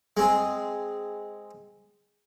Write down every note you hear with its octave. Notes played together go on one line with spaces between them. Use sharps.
G#3 C4 G#4